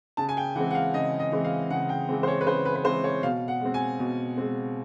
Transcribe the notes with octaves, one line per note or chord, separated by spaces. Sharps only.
C#3 A5
G#5
G5
E3 G#3 C4 F#5
F#5
F5
C#3 D#5
D#5
E3 G#3 C4
F5
C#3 F#5
G5
E3 G#3 C4
C5
C#5
B4
C#3 C5
B4
B4
E3 G#3 C4 C5
C#5
B2 F5
F#5
G#3 C4
G#5
B2
G#3 C4